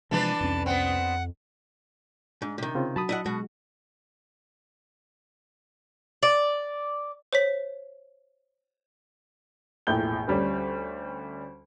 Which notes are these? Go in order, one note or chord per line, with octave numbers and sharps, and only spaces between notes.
C3 E3 F3 G#3 D4 B4 A5
C2 F2 C#4
B3 C4 F#5
G#2 D4
C3 D#3
C#3 C4 F4
F#3 F#4 A5 B5 D#6
E4 D#5 F#5
B2 G#3 F#4
D5
C5 C#5 B6
E1 A#1 A2 G5 G6 G7
D2 G3 C#4